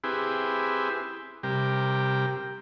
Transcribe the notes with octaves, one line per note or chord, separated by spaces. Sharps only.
C4 E4 G4 G#4 B4
C3 G3 G4 A#4